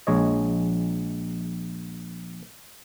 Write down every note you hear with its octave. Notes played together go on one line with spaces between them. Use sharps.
A#1 G#3 C#5 D#5